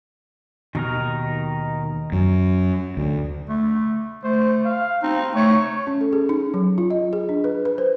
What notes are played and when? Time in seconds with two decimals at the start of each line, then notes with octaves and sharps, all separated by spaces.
0.75 D#2 B2 D#3 D#4 A#4
2.12 F#2
2.97 D2
3.49 A3
4.23 A3 C5
4.65 F5
5.03 C4 D#4
5.35 A3 C#5
5.87 C#4
6.01 A4
6.13 G#4
6.29 D#4
6.54 F#3
6.78 F4
6.90 D#5
7.13 G#4
7.29 D4
7.44 B4
7.65 B4
7.78 C5